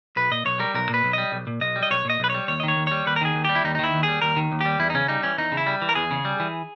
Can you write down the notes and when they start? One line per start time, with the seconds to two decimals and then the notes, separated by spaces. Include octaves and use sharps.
0.16 B1 B4
0.31 A#2 D#5
0.45 B1 C#5
0.59 G3 A#4
0.74 B1 A#4
0.89 A#2 B4
1.04 B1
1.13 G3 D#5
1.32 B1
1.47 A#2
1.61 B1 D#5
1.76 G3
1.83 D#5
1.91 B1 C#5
2.05 A#2 D#5
2.20 B1 B4
2.30 G3 C#5
2.48 D#2 C#5
2.60 D#5
2.63 D#3 C#5
2.77 D#2
2.87 G3 C#5
3.07 D#2 B4
3.16 A#4
3.21 D#3 G#4
3.35 D#2
3.45 G3 G4
3.55 E4
3.65 D#2 D#4
3.75 D#4
3.79 D#3 E4
3.94 D#2
4.03 G#4
4.08 G3
4.22 D#2 A#4
4.36 D#3
4.52 D#2
4.61 G3 G4
4.79 E2 E4
4.90 D#4
4.94 C#3 C#4
5.08 G3 D#4
5.23 E3 C#4
5.38 E2 D#4
5.52 C#3
5.57 E4
5.66 G3
5.82 E3
5.89 A#4
5.95 E2 G#4
6.11 C#3
6.25 G3
6.40 E3